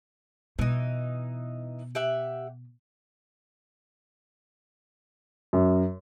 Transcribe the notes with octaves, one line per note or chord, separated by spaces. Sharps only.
B2 E3 D#4
G4 E5 F#5
F#2